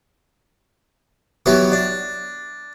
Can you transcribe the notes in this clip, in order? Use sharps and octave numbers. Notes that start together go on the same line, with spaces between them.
E3 F#3 B3 G4
D4